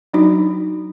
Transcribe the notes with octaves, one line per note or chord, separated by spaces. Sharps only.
F#3 D4 D#4 F#4